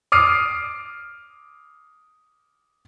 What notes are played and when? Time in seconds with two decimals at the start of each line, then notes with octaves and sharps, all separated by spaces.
0.12 D6 D#6 F6 C7 D7 D#7